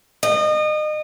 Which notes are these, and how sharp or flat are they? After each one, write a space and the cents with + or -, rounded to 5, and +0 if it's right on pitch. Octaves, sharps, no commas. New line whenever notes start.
D#5 -30